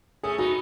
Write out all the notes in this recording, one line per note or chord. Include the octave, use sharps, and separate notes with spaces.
A3 C#4 G#4
B3 D#4 F#4